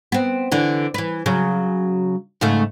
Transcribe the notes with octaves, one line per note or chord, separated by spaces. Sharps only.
B3 C4
D3 E3
E3 B4
C#3 F#3
G#2 C#3 A3